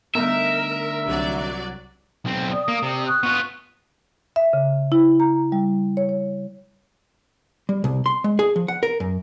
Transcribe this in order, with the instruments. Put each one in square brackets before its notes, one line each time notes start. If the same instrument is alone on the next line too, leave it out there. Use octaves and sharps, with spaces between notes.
[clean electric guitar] D3 A3 D#4 [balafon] G3 B3 [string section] A#4 [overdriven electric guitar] E5
[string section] C2 F#3 D5 [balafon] D4 G4
[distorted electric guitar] B1 C4
[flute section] D5 D#6
[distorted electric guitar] A#3
C3
[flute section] C#6 D#6 F#6
[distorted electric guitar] B3 F4
[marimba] E5
C#3
E4
A#5
G3
C#5
C#5
[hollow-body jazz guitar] G3
C2
C6
G#3
G#4
F3
F#5
A#4
F#2